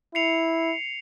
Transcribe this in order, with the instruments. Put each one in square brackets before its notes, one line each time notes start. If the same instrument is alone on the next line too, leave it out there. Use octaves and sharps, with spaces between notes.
[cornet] E4 [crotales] C7 C#7 F7